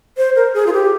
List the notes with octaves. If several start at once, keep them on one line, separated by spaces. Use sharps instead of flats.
C5
A#4
G#4
F4
G4